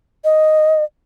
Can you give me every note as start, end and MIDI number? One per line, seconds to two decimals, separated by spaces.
0.24 0.84 75